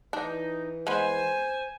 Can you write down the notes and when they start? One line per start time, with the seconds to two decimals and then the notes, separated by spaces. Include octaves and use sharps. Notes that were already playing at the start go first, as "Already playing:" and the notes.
0.13 E3 D4 D#4
0.87 G#3 B3 C5 G#5